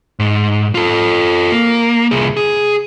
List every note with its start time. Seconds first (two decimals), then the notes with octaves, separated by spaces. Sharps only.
0.19 G#2
0.75 F4 A4
1.52 A#3
2.11 C2 G#4
2.37 G#4